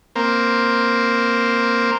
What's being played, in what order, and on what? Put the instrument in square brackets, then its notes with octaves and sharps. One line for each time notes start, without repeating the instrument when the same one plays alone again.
[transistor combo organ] A#3 C4